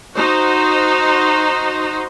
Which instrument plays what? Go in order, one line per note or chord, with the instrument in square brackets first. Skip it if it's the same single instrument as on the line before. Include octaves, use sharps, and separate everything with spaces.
[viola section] D#4 F#4 C5